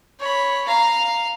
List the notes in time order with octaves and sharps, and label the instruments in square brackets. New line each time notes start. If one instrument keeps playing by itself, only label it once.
[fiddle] C#5 B5
[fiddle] F5 [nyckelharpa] A#5